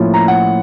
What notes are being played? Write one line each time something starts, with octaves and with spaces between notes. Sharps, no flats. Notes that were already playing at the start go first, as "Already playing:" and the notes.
Already playing: A2 F3 A#3 C#4
A#5
F#5